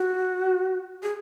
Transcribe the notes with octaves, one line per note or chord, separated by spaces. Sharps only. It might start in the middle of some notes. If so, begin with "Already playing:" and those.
Already playing: F#4
G#4